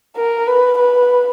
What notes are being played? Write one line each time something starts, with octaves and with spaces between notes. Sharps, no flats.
A#4
B4
B4